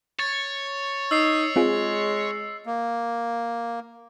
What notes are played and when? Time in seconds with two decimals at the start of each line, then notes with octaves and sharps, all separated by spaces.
0.19 C#5 A6
1.11 D#4 E6 C7
1.56 G#3 C4 F4 G#4
2.66 A#3